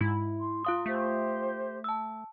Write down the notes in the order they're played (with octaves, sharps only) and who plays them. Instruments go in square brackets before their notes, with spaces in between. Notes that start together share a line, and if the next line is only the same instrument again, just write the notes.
[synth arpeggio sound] G#2 [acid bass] E4
[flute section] C6
[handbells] F4 F5 D#6
[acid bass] A3 [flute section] G4 C5
[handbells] A5 E6